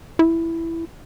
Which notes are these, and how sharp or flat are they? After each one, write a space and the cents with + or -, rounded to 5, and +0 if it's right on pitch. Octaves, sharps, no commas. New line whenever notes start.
E4 +5